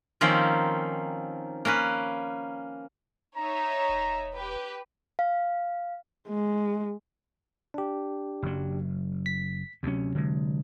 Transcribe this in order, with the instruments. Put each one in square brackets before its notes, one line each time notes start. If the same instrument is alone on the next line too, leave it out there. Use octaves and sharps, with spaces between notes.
[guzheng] D#3 F3 A#3 C4 C#4
A#3 C#4 A#4 B4
[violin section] D#4 C#5 E5 [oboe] A#5
[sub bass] E1
[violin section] G4 B4
[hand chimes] F5
[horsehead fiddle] G#3
[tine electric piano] D4 G4
[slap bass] F#1 F#3
[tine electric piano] B6
[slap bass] D2 C#4 [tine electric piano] C3 F#3
[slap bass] D3 G#3